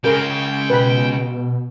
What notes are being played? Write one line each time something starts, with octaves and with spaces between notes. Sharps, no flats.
C#3 G#3 G#4 A#4 G5
B2 B4 B5